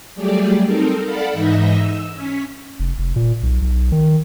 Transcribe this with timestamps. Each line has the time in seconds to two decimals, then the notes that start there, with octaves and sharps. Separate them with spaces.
0.15 F#3 G3 A3 G4 G#4 D5
0.65 C4 D#4 A4 A#4
1.04 A4 D5 F5 F#5 B5
1.33 G#2 E3 D#4 D#5 E5 A#6
1.74 E6
2.13 C#4 B6
2.80 F1
2.99 F1
3.16 A#2
3.43 B1
3.62 B1
3.92 D#3